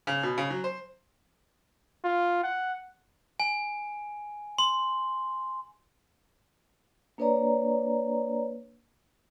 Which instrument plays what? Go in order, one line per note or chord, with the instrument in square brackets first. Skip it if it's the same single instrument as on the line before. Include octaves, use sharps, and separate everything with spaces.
[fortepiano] C#3
B2
C#3
F#3
C5
[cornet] F4
F#5
[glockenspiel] G#5
C6
[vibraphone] A#3 D4 B4 C#5 D5 A#5